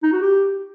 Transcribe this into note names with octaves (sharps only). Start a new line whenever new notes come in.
D#4
F#4
G4